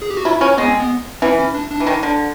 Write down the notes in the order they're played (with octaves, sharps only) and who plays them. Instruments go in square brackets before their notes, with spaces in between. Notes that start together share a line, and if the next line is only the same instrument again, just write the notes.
[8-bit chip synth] G#4
G4
F#4
[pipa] E4 [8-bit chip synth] F4
[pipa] C#4 [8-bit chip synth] E4
[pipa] G#3 [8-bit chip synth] B3
[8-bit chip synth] C4
B3
[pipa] E3 [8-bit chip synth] C4
[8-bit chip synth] C#4
D4
D4
[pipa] E3
D#3
D3